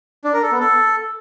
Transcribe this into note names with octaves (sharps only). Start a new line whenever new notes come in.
D4
A#4
A4
B3
A4